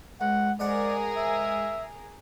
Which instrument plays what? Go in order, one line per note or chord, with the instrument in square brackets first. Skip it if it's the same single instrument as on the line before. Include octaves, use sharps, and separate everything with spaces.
[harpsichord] C#2 [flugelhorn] F#5
[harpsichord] G#2 D#5 F#5 [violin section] G#4 A#4 [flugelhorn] D5
[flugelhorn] E5